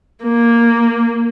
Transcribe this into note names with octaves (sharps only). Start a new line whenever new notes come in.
A#3